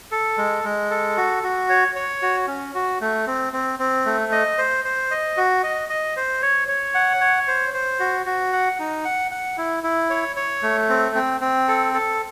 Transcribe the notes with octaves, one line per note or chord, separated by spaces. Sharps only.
A4
G#3
G#3
A4
F#4
F#4
C#5
C#5
F#4
C#4
F#4
A3
C4
C4
C4
A3
D#5
C5
C5
D#5
F#4
D#5
D#5
C5
C#5
C#5
F#5
C#5
C5
C5
F#4
F#4
F#5
D#4
F#5
F#5
E4
E4
C#5
C#5
A3
C4
C4
C4
A4
A4